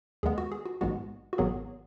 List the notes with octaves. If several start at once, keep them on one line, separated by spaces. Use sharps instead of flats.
D#2 D#3 G#3 B3 G#4
F#4
G#4
F#4
A#1 G#2 E3 G#3 B3 F#4
F#4
G#1 G#2 D#3 F#3 B3 G#4